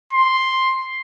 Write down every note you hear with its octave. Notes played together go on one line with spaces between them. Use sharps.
C6